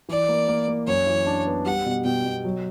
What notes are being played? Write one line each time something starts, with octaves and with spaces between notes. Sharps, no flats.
E3 D5
A#3
A#3
A#3
F#2 C#5
E3
D4
B3
G3 F#5
B2
B2 G5
B2
F#3